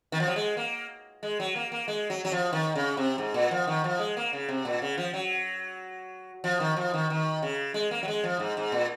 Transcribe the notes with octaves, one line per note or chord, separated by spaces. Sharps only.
D#3
F3
F#3
G#3
A#3
G#3
F#3
A#3
A#3
G#3
F#3
F#3
F3
D#3
C#3
C3
G#2
A#2
F3
D#3
F3
G#3
A#3
C#3
C3
A#2
C#3
F3
F#3
F3
D#3
F3
D#3
D#3
C#3
G#3
A#3
F#3
G#3
F3
G#2
G#2
A#2